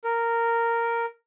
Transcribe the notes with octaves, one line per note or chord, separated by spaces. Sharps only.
A#4